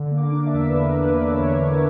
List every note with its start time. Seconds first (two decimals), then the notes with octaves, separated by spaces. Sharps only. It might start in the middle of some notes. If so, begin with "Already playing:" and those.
Already playing: D3
0.11 A#3
0.17 D6
0.32 D4
0.46 E5
0.54 E2
0.69 B4
0.76 D3 A#4
0.97 A#3
1.03 B4
1.19 D4
1.33 C#5
1.40 E2
1.62 D3 C#5